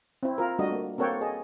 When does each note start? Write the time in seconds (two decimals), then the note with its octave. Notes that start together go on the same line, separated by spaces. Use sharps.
0.23 C4 E4
0.38 F4 A#4
0.59 G3 A3 D4 F#4 D#5
0.72 A#3
0.98 A#3 C4 A4 C#5 F#5 G5
1.21 G#4 D#5 A5